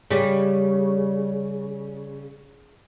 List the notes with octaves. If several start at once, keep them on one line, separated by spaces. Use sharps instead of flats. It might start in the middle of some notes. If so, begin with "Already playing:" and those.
C#3 G3